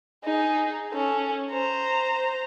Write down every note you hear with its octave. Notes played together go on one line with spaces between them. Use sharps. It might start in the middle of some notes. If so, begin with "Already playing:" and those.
D#4 G#4
C#4 A4
C5 A#5